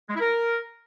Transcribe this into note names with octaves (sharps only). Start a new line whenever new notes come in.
G#3
E4
A#4